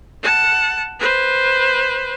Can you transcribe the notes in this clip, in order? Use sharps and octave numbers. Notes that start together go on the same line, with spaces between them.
F#5 A5
B4 C5